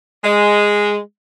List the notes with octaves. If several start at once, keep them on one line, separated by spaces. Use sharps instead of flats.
G#3